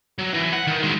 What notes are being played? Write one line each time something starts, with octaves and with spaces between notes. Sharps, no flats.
F#3
E3
F#5
D#3
G#3 F#4